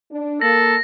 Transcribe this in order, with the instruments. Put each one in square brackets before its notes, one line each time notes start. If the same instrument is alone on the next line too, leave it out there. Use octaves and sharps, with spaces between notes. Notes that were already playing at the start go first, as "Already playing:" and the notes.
[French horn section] D4
[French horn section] A#3 [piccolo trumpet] A4 [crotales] A#6